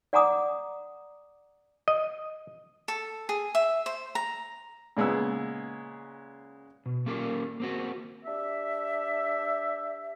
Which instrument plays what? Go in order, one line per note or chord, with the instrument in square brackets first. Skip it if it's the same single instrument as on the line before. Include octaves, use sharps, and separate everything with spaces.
[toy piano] D5 F#5 G#5 A#5 D6 D#6
[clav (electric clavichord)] D#5
[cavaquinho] A4
G#4
E5
C5
A#5
[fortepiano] A#2 C#3 G#3 B3 E6
[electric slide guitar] B2
A#3 C#4 F4 G4 A#4
A#3 C4 F#4
[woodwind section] D4 G4 E5